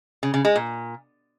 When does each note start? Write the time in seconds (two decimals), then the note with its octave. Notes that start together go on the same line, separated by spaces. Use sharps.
0.23 C#3
0.34 C#3
0.45 G#3
0.56 A#2